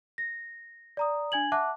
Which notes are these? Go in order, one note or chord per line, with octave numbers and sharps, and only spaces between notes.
A#6
D5 A#5 D#6
D4 G#5 G#6 F#7
E5 F#5 A5 D6 F#6